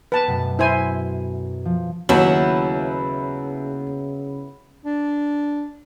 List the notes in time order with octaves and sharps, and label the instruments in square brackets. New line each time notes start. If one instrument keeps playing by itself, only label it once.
[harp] B3 G4 [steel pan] B4 A5
[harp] F#2 B2 A3
[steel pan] E4 C5 G#5
[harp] F3
[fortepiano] D#2 [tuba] C#3 [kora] F#3 [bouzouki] B3 E4
[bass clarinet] D4